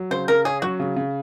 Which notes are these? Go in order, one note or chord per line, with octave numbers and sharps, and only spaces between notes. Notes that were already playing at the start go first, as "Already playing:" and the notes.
Already playing: F#3
C#3 C5
C#3 A#4
C#4 G#4
F#3 F#4
C#3
C#3